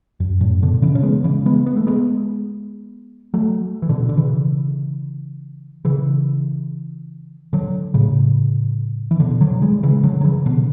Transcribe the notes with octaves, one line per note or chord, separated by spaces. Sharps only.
F#2
F#2 A2
B2 D3
C#3 E3
C#4
G#3 B3
C#3 E3
G#3 B3
B3
A3
G#3 B3
F#3 A3
E3
B2 D3
D3
C#3 E3
C#3 E3
D3 F#3
A2 C#3
E3
B2 D3
D3 F#3
E3 G#3
C#3 E3
D3 F#3
F#3
C#3 E3
B2 D3